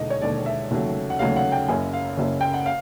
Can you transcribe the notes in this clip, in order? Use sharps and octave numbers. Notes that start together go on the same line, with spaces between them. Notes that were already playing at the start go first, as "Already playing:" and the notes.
Already playing: E1 D#2 D3 D#5
C#5
E1 D#2 D3 D5
E5
F1 D#2 C#3 F#3 A3
F#5
F1 D#2 C#3 F#3 A3 F5
F#5
G5
F#1 F#2 C#3 G#5
F5
F#1 F#2 C#3
G5
F#5
F5